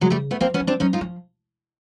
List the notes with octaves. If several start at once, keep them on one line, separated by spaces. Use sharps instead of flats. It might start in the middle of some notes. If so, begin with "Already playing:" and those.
C#3 F#3 G#3
G3 A3
A3 B3
F3 A#3 C4
B3 C#4
F3
C4 D4
F#3 C#4 D#4
D#4 F4
F3